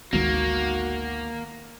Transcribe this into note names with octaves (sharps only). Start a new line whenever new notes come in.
G#1 D2 D#3 G#3 A#3 B3 F#4